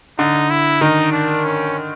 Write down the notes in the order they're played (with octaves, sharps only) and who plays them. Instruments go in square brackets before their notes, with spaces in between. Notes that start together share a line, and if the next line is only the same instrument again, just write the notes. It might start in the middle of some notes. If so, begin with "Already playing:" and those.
[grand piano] D3 [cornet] D#4
[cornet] E4
[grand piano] D#3 [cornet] D#4
[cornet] D4
C#4